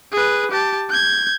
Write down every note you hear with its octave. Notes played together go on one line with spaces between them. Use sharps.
G#4 B4
G4 A5
G6 G#6